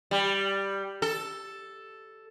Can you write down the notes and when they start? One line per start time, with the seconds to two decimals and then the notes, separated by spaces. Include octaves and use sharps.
0.11 G3
1.02 A4